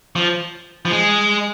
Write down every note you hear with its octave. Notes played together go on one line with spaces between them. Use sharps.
F3
F3
G#3